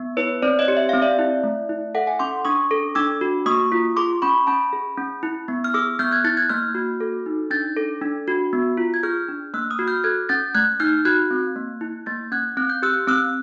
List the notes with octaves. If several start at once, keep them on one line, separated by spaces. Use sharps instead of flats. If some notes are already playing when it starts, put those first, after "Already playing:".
Already playing: B3
E4 B4 C#5
C4 C5 D5
C#5 D#5
G4
E5
C4 F5
D5 E5
E4
A3
E4
A4 E5 F#5
F#5 G#5
C#4 C6 D6
D4 C#6 D#6
A4
D4 D6 E6
F#4
A#3 C#6 D#6
F4
G#4 C6 D6
C#4 B5 C#6
C#4 A5 B5
G#4
C#4
E4
B3
F6
G#4 D6 E6
B3 F6 G6
F#6 G#6
E4 G6 A6
F#6 G#6
A#3 F6 G6
F#4
A4
D#4
D4 G6 A6
A4
D4
F#4
B3
F4
G#6
G#4 F6 G6
D4
A#3 E6 F#6
D#6 F6
F#4
F6 G6
A4 F#6 G#6
C#4 G6 A6
A3 F#6 G#6
D#4 F6 G6
F#4 F#6 G#6
C4
A#3
E4
A#3 G6 A6
C#4 F#6 G#6
C4 F#6
G6
G4 E6 F#6
C4 E6 F#6